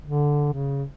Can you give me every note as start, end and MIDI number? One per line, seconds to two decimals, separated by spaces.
0.04 0.53 50
0.53 0.84 49